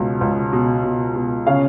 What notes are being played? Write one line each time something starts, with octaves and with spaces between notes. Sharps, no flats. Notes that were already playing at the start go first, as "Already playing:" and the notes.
Already playing: C#2 B2
C#2
B2
B2
B2
C#3 F5